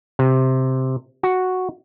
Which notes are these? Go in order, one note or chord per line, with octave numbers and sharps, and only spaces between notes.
C3
F#4